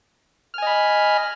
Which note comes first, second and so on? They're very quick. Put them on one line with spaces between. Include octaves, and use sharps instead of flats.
F6 G#5 D#5 B5